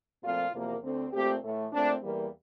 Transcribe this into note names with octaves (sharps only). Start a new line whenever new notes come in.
A#2 F3 A3 C4 F4
E2 C3 F3 A#3
D2 D3 A3 C4
A#2 A3 C4 G4
A2 E3 A3
A#2 A3 C4 D4
E2 E3 G3 A#3